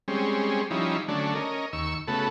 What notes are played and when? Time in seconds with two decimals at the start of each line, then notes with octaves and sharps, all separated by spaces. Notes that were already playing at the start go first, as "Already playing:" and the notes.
0.08 G3 G#3 C4 C#4
0.71 F3 G3 C#4 D#4 E4
1.08 D3 F#3 A3 C#4 D4
1.35 C#4 A#4 D#5
1.73 D#2 C#6 E6
2.08 C#3 A3 B3 F#4 A4